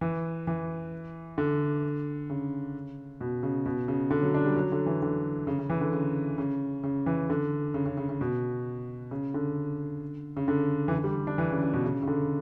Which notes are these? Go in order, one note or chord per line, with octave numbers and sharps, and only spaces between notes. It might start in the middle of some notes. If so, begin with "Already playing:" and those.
E3
E3
D3
C#3
B2
C#3
B2
C#3
D3
F#3
D4
G3
F#3
D3
E3
D3
C#3
C#3
E3
D3
C#3
C#3
C#3
E3
D3
C#3
C#3
C#3
C#3
B2
C#3
D3
C#3
D3
E3
D3
G3
D4
E3
C#3
C#3
B2
C#3
C#3
D3